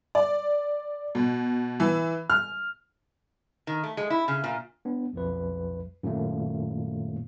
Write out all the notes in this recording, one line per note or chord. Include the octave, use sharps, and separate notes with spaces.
D5
B2
E3
F6
D#3
A3
G#3
E4
C#3
A#2
B3 D4
B1 F2 F3 B4
F#2 A#2 D#3 A3 A#3